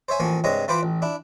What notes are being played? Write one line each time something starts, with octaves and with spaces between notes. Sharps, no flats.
C5 C#5 E5 G#5
A1 F3 A#3 G#5 C#6
G2 C3 G#3 C#5 A#5 D#6
E3 F4 C5 G5 B5 D6
A1
D4 E4